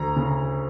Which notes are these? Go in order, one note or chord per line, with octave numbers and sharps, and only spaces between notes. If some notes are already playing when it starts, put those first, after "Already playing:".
Already playing: D2 A#5
C#3